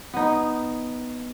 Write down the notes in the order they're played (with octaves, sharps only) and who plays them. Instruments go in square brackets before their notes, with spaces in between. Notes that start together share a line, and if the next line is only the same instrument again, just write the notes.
[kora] B3 D#4